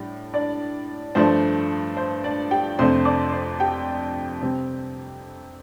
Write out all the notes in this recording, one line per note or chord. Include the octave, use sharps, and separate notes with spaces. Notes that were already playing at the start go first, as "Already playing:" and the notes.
Already playing: A2 G3 D4
D4 D5
G2 F3 A3 D4 C5
C5
D4 D5
G4 G5
F2 C3 A3 D4 C5 C6
D5 D6
C5 C6
G4 G5
C3 G3 C4